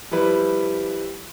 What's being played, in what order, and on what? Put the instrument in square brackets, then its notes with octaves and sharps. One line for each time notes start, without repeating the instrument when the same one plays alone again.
[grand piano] F3 G3 E4 B4